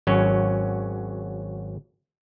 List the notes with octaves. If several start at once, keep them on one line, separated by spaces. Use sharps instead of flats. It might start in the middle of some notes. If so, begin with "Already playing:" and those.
G#1 F#3 C#4